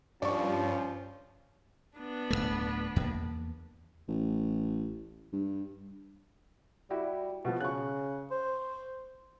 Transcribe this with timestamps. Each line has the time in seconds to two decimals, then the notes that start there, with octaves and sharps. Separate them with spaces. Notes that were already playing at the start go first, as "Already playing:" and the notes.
0.22 G2 F3 C#4 D5 C#6
1.98 B3 D4
2.30 D1 E2 A3
2.96 E2 A#3
4.08 A1
5.33 G2
6.90 G3 E4 F#4 G4
7.45 B2 F3 F#4
7.60 C#3 C#6 F#6
8.31 C5